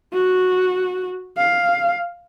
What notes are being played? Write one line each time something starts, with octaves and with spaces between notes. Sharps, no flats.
F#4
F5